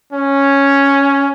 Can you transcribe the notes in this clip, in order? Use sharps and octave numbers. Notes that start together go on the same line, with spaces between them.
C#4